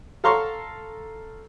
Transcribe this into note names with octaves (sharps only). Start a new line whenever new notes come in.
A4 F5 A#5 C6 C#6